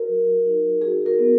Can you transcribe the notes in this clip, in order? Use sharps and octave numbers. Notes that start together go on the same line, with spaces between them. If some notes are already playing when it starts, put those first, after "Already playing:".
Already playing: F#4 A#4
F#3
D#4
F#4 G#4
A#4
B3